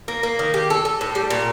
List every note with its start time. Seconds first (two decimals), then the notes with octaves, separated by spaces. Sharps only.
0.08 A#3
0.23 A#3
0.39 D#3
0.54 G4
0.70 A4
0.85 A4
1.01 A2
1.15 G3
1.30 A#2